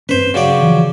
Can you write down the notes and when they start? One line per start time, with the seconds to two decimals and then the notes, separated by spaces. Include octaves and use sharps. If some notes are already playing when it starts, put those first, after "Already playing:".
0.09 G2 C4 C#4 B4 C5
0.34 C#3 F#3 D5
0.63 E3 F3